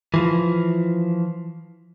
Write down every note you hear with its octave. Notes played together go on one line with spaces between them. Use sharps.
E3 F3